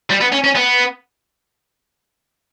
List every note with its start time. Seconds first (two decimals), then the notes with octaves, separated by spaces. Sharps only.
0.11 G3
0.21 B3
0.32 C#4
0.44 C#4
0.55 B3